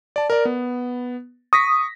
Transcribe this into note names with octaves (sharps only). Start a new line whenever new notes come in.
D5 A5
A#4 D5
B3
C#6 D#6 A#6 B6